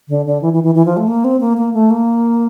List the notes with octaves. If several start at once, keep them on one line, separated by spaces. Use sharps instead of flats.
D3
D3
E3
E3
E3
E3
F3
A3
A#3
C4
A#3
A#3
A3
A#3